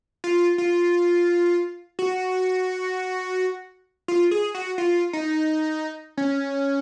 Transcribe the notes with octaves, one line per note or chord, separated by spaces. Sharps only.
F4
F4
F#4
F4
G#4
F#4
F4
D#4
C#4